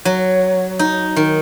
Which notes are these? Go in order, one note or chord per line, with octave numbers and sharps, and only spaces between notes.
F#3
D#4
D#3